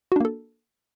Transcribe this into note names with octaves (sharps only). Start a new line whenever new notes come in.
A#3 D4 F#4 A4